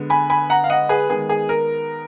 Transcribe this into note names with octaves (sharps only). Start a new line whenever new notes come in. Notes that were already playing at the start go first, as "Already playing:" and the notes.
Already playing: D3 G#3 B3
G#5 B5
G#5 B5
F#5 A#5
F5
D#5 F#5
G#4 B4
D#3 G#3 B3 G#4
G#4
A#4